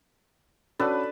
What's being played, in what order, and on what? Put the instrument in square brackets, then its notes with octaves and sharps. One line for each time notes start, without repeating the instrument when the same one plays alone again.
[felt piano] C#4 F#4 D5 [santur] D4 A4 B4